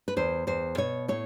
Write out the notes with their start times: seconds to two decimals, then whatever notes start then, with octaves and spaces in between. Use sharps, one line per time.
0.08 B4
0.17 E2 C5
0.47 E2 C5
0.77 B2 C#5
1.08 A2 C#5